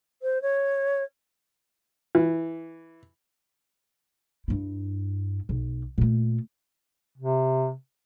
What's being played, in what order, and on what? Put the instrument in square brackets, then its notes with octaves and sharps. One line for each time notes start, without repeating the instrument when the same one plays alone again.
[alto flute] C5
C#5
[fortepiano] E3
[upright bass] G2 E4
B1
A#2 A3
[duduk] C3